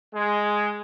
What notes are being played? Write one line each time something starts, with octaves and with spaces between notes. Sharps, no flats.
G#3